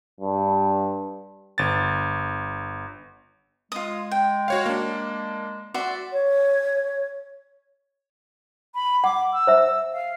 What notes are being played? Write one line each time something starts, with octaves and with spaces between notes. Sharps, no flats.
G2
G1 A6
G#3 F4 D#6
G5
F#4 C#5 F5
A#3 D4
F#4 D5 E5 C6
C#5
B5
F#5 D6
E6
C5 E5
F5